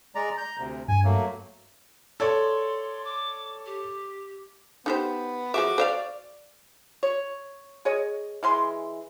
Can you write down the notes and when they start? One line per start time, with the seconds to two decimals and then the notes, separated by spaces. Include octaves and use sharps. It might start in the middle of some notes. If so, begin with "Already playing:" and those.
0.15 G#3 D5 A#5
0.38 A#5 G6
0.58 D2 C3
0.88 G2 G#5
1.04 F#3 A3 A#3
2.20 A4 C#5 D5 C6
3.04 D6
3.66 G4
4.86 B3 D#4 G4 C5
5.54 F3 G#3 F#4 E5 D6
5.78 C5 D5 E5 F5
7.03 C#5
7.85 G#4 C#5 D#5
8.43 E3 G#3 C6